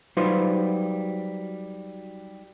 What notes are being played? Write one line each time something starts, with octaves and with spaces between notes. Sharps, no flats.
F#3 G3 D#4 F4 B4 C5